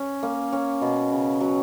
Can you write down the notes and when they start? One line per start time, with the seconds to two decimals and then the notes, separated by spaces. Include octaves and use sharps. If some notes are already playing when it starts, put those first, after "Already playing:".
Already playing: C#4
0.23 A#3
0.52 C#4
0.81 B2
1.12 C#3
1.41 F#3